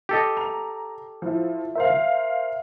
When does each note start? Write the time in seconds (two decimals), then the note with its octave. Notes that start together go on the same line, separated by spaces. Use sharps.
0.09 G4 A4 D#5
0.37 A#5 F7
1.22 F3 E4 E5
1.76 A#4 C5 E5 F5